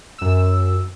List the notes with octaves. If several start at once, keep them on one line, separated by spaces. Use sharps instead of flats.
F#2 E6